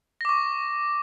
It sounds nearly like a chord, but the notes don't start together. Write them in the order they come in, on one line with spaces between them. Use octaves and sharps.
A#6 D6 C#6